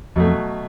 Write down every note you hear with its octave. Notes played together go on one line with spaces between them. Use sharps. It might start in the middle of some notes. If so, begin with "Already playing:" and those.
F2 B2 F#3 A3